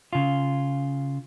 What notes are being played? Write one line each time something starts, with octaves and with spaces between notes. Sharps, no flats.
C#3 F4